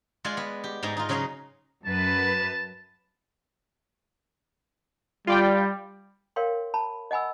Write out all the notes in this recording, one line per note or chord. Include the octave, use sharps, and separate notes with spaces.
G#3 F4 D5 F#5 G#5
B3
G4
G#2 G#3 D#4 A#5
D#4 F4
C#3 F#3 C#5 D#5 F5
F#2 B4 A5
G3 F4 D5 G5
A#4 C#5 F5 G5 C6
A5 B5
D#5 F#5 G#5 B5 E6